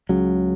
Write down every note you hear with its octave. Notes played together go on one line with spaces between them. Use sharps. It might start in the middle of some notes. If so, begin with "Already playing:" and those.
C#2 C#3 F#3